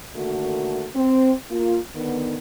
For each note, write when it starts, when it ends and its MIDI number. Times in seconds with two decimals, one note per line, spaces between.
0.16 0.88 50
0.16 0.88 51
0.16 0.88 57
0.16 0.88 58
0.16 0.88 66
0.96 1.33 60
1.51 1.79 58
1.51 1.79 65
1.95 2.37 50
1.95 2.37 51
1.95 2.37 59